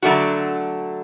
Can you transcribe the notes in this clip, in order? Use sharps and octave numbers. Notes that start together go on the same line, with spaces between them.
D3 F#3 A3 D4 F#4